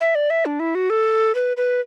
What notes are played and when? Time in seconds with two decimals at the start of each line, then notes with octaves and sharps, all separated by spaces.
0.01 E5
0.15 D5
0.30 E5
0.45 D4
0.60 E4
0.75 F#4
0.90 A4
1.35 B4
1.57 B4